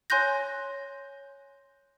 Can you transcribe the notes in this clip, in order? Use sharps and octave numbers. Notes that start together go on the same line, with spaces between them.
C#5 G#5 C6 F#6 G6 A#6